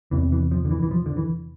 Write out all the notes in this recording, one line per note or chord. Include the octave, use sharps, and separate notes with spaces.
E2 C3 E3
E3
F3
D3
E3
E3
F3
D3
E3